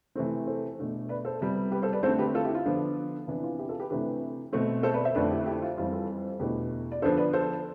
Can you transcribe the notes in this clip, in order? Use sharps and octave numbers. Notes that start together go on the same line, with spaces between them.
C3 E3 A3 C4
A4 C5
B2 A3 D4
B4 D5
A4 C5
C3 G3 B3
G4 B4
A4 C5
B4 D5
D3 A3 C4 A4 C5
G4 B4
F4 A4
E4 G4
F4
D3 F3 B3 D4
C3 E3 B3 D4 E4
F4
E4 G4
F4 A4
G4 B4
C3 E3 A3 D4 G4 B4
B2 A3 C4
A4 C5
B4 D5
C5 E5
F2 D3 A3 D4 B4 D5
E4 G4
E4 G4
F4
F2 E3 G3 C4 F4
F4 A4
E2 B2 A3 D4 G4 B4
D5
D3 F3 B3 D4 A4 C5
B4 D5
A4 C5